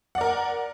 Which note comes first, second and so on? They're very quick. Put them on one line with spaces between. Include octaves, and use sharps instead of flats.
F#5 D5 A#4